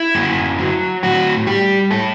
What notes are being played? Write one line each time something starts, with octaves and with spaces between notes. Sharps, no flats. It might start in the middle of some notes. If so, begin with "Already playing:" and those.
Already playing: E4
F#2
F#3
A2 F#4
G3 G4
A2 A4